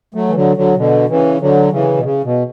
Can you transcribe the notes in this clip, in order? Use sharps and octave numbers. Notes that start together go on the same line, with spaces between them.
F#3 A3
E3
D3 F#3
D3 F#3
B2 D3
C#3 E3
D3 F#3
C#3 E3
B2
C#3
B2